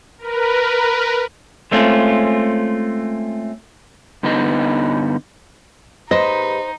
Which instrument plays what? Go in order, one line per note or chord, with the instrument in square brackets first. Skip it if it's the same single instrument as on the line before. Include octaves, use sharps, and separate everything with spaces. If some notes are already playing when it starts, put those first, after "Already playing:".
[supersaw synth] A#4 B4
[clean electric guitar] G#3 A3 C4 C#4 F4
[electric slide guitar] G2 D3 B3 D#4 D#5
[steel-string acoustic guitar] D#2 G#2 B4 [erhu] D#4 [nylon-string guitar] C5 [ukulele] D#5